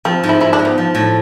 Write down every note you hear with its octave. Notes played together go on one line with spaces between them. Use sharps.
F3 C4
G#2
E4
G#2 E4
D4
G#2
B3
F3
A2